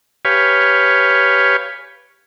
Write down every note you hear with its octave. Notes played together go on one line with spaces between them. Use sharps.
G4 B4 C#5 F5 G#5